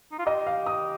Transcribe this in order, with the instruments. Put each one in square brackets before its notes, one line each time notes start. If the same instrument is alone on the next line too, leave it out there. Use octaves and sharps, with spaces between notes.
[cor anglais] D#4
F4
[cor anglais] G4 [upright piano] D#5
[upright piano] F5
D#6